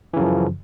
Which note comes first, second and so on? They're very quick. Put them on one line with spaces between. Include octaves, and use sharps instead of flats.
E3 C#3 F#2 F3